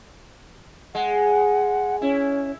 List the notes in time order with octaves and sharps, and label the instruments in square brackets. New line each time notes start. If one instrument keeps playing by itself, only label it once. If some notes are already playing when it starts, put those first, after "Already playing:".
[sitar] G#3 [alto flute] F#5
[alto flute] C#4 [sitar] E4